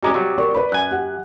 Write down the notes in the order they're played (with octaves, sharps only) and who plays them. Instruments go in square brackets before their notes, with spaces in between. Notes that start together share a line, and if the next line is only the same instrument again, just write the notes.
[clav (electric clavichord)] G3 G#3 C#4 [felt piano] F#4 A#5 D6
[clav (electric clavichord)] C3 F#3 G3
[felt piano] A#4 D5 C#6
B4 D5 B5
[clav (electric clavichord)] F#2 G#5 [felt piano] F#6
[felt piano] G4 F#5